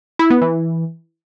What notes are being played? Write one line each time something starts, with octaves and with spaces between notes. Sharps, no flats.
E4
B3
E3